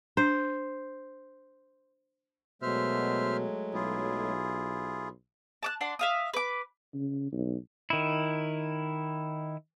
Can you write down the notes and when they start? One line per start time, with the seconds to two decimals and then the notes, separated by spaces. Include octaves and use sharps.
0.17 D4 C5
2.62 B2 F#3 G#3 A3 C5 E5 F6
3.74 B1 E4 F4 G#4
5.63 A5 D6 F#6
5.81 D4 F#5 C6
5.99 E5 F5 D#6
6.34 B4 D6
6.94 C#3
7.32 B1
7.90 D#3 E4